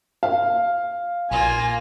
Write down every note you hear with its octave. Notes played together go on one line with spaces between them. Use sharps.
F5
A#1 A#3 F4 G#5